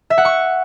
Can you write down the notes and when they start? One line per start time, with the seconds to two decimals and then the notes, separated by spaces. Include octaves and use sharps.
0.10 E5
0.18 F#5
0.25 C#6